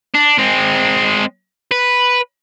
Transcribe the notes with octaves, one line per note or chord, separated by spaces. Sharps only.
D4
G#3 C4
B4